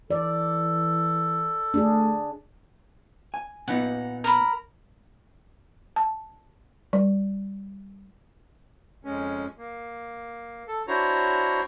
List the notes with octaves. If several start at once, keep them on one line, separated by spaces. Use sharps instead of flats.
E3 A4 D5
A3 D4 G#4
G#5
A#2 B3 D#4 F#5
A#4 B5
A5
G3
F2 G#3 C#4
A#3
A4
D4 E4 F#4 C5 C#5 A#5